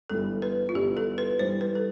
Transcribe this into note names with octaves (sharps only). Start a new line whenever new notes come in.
G1 G2 E3 A4
B4
F4
G1 G2 E3 G4
A4
B4
G2 E3 G3 C5
B4
A4